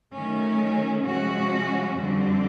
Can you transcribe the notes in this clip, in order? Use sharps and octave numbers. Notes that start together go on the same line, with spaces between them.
D#3 F#3 A3 C#4
C3 F3 G#3 C#4 F#4
F2 D3 G3 C4